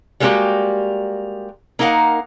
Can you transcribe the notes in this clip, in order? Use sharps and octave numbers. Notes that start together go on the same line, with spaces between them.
G3 G#3 A#3 E4 F#4 G4
A#3 D#4 A#4 F5 F#5